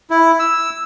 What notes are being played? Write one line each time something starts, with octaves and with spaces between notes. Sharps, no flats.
E4
E6